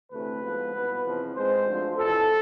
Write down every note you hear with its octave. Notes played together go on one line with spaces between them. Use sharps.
D2 C3 E3 A3 C4 B4
G#2 F3 B3
C2 B2 B3
E2 C3 F3
G#2 G#3 C4 C5
D2 D3 F3
F2 C3 E3 A4